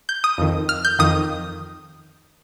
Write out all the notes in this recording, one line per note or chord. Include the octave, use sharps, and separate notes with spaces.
G6
D#6
F2 D#3
F6
G6
F2 D#3 D#6